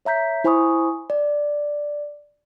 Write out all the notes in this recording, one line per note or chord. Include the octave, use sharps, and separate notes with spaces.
C#5 E5 A#5 G6 B6
E4 C5 G#5 B5 C#6 D#6
D5